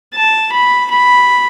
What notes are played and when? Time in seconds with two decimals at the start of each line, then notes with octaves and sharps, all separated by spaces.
0.14 A5
0.52 B5
0.91 B5